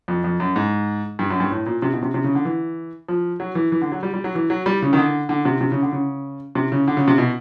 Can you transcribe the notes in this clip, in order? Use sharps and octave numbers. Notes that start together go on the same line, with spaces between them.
F2
F2
F#2
G#2
G2
F#2
G2
A2
A#2
C3
B2
C3
C3
C#3
D3
E3
F3
F#3
E3
E3
D3
F#3
G3
G3
F#3
E3
F#3
G3
C#3
D#3
D3
D3
C3
C3
C#3
D3
C#3
C3
C#3
D3
C#3
C3
B2